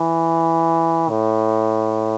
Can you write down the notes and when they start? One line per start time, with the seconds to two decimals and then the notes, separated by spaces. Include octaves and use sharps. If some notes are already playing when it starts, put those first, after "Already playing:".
Already playing: E3
1.09 A2